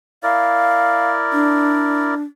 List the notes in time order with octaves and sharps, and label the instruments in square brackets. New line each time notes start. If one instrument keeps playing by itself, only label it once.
[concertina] E4 A#4 D5 [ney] F5
[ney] D4